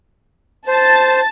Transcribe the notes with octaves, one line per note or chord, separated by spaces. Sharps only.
C5 A5 A6